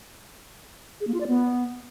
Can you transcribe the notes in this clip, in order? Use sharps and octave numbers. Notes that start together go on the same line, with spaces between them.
G#4
A#3
F4
D5
B3